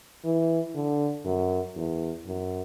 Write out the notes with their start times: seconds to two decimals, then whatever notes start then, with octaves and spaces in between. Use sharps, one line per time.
0.24 E3
0.75 D3
1.25 F#2
1.76 E2
2.27 F#2